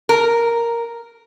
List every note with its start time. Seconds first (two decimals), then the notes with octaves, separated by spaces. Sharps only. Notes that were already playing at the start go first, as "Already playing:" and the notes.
0.09 A#4